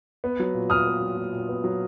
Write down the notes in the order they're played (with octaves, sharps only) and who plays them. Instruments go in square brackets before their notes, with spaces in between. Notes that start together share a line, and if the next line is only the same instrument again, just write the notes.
[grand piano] B3
F#3
A#2
A#2 D#6 F6
B3
F#3
A#2
A#2
B3
F#3